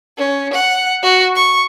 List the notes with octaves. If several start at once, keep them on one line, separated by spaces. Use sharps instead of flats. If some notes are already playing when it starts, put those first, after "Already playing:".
C#4
F#5
F#4
C#6